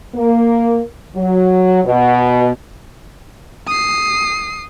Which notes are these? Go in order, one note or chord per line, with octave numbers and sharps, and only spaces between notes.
A#3
F#3
B2
D#6 C7